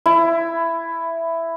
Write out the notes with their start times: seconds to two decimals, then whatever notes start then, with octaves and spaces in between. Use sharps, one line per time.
0.06 E4